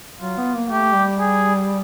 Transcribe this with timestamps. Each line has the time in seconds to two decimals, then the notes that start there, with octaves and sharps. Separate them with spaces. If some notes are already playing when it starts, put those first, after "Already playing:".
0.20 F#3 F4
0.37 B3
0.54 A#3
0.70 A3 G4
0.94 G3
1.19 G#4